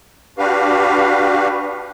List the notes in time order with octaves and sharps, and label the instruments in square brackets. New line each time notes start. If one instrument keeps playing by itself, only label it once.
[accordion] D4 F#4 G4 B4 F5